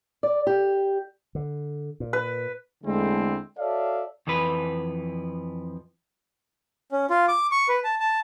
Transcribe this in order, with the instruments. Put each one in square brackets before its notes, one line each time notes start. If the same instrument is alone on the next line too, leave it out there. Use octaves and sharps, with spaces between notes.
[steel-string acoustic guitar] D5
G4
[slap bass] D3
A#2
[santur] B4
[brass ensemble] E2 D3 G#3 A3 C4 E4
F#4 A4 C#5 D5 E5 F5
[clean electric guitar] F2 E3 F3 B4
[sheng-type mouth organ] C#4
F4
D6
C#6
B4
A5
A5